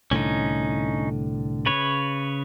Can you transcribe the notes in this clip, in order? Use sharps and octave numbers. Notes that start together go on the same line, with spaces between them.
C2 A2 D3 C#4 D#4
C#3 B4 C#5